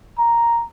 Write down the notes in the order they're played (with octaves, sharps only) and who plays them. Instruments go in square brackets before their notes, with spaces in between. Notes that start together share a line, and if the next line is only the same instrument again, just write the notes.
[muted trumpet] A#5